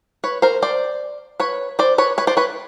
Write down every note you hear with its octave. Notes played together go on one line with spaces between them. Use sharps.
B4 C#5
A#4 C5
C5 D5
B4 C#5
C5 D5
B4 C#5
B4 C#5
C5 D5
B4 C#5